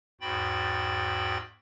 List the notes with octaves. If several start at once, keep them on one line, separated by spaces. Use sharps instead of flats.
E2 G#2 F#4 G5 B5 A6